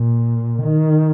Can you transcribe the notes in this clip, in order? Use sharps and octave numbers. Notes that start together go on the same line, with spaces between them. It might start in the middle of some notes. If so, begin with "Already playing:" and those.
Already playing: A#2
D#3